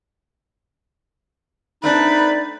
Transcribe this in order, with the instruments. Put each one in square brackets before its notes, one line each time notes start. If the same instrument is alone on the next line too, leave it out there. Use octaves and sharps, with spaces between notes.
[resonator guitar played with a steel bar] A3 C4 D4 [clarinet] D#4 [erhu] B4 [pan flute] D5